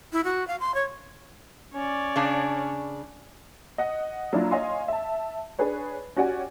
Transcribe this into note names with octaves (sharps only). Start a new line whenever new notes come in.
E4
F#4
F5
C6
C#5
C#4 C#5 D5
C#3 D4
D#5 F#5
F#3 A#3 D4 E4 F4
C#5 D#5 F5 G#5 C6
E5 A5
D4 G#4 B4 C#5
C#4 F#4 G4 D5 F#5 G#5